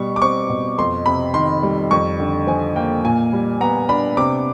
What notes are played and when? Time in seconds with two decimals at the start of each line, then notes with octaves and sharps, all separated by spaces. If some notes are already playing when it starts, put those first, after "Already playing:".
Already playing: B2 G3 C#6
0.16 D6
0.22 C4 C#6
0.49 B2
0.78 F2 C6
1.06 C3 B5
1.34 D#3 C6
1.63 G3
1.91 F2 C#6
2.20 D3
2.47 F3 G#5
2.76 A#3 G5
3.04 A#2 G#5
3.33 G3
3.61 B3 A#5
3.89 D4 B5
4.17 C3 D6